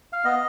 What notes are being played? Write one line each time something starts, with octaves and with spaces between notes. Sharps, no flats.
F5
B3 D#5